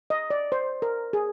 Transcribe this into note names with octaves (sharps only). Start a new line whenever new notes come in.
D#5
D5
C5
A#4
G#4